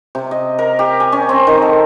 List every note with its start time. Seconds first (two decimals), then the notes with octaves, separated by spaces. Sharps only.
0.15 C3
0.31 D#5
0.59 A#4
0.79 G4
1.00 G#5
1.12 C#4
1.29 C4
1.47 D#3
1.62 A4